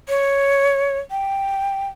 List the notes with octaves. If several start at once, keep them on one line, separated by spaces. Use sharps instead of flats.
C#5
G5